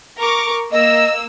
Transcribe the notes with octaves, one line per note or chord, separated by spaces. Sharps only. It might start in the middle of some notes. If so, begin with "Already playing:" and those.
A#4 C#6 D6
A#3 D#5 E6